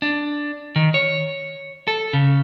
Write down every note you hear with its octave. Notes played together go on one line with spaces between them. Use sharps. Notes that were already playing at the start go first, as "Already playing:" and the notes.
D4
D#3
C#5
A4
C#3